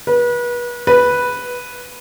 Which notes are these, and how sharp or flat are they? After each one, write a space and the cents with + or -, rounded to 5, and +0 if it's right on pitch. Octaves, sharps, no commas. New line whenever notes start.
B4 -35
B4 -5